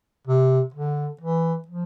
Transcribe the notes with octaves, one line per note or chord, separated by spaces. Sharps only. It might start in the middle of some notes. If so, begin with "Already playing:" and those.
C3
D3
E3
F3